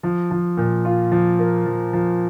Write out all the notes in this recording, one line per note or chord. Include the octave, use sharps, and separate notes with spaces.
F3
F3
A#2
F4
F3
A#3
F3
F3